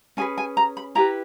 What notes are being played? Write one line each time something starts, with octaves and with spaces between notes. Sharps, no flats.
C#4 G#4 B4 G#5
G#5
A#5
B5
E4 G4 B4 A#5